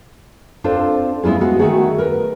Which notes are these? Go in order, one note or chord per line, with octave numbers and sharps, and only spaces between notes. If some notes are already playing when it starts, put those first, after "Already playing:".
C4 D4 F4 A4 C5
G#3 B3 E4 F4 G#4
G#3 B3 F4 F#4
D#3 E3 A3 F#4 G#4 F#5
A#4 B4